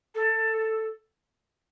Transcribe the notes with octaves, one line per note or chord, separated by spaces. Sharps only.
A4